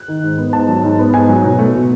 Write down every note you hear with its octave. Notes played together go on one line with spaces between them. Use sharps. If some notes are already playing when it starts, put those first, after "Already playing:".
Already playing: F#6
D#3
G#2
B3
G#2 A5
F#3
G#2
B3
G#2 G#5
F#3
B2
A3
B2